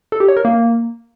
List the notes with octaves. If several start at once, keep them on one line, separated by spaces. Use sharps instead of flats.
A4
G4
C#5
A#4
A#3